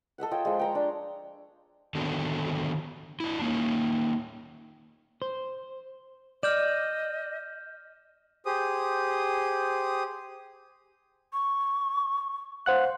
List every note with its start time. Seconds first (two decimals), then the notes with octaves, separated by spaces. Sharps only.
0.18 A4 D#5 E5 F#5
0.31 F4 C#5 D#5 G5
0.45 F3 G#3
0.59 G5 A#5 C#6
0.75 D4
1.95 D3 D#3 B3 D4 F#4 A4
3.20 D4 E4
3.42 A#3 C#4 D#4
5.22 C5
6.43 D5 D#5 F6 G6 E7
8.46 G4 G#4 C5 D#6
11.33 C#6
12.66 C5 F5 F#5 F#6